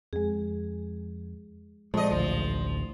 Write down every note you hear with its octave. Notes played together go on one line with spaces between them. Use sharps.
F2 G#3 G#4
F2 A#2 G#3 D5 D#5 A5
A1 D2 F3